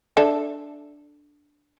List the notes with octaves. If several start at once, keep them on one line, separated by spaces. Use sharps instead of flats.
D4 A4 E5